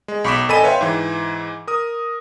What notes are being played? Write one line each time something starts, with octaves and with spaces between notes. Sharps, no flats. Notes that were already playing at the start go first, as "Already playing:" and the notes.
G#3
B1 B5 C#6 D6 B6 E7
G#1 A4 D#5 G#5 B5 D#7
B4 C#5 E5 F5 G5 C6
G#2 E3
A#4 D#6